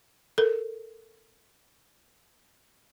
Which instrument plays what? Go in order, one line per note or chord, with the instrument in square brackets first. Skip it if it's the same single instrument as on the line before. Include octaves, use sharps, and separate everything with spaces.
[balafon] A4 A#4